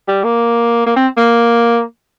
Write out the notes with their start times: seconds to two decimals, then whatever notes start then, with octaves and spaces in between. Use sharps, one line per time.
0.08 G3
0.24 A#3
0.86 A#3
0.96 C4
1.17 A#3